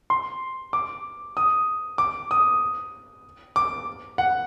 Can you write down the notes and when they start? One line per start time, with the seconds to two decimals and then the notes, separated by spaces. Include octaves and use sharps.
0.10 C6
0.73 D6
1.37 D#6
1.98 D6
2.31 D#6
3.56 D6
4.18 F#5